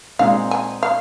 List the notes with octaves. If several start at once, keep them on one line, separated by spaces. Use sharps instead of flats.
A#2 G#3 C4 D#4 G#4 F5
G#5
F5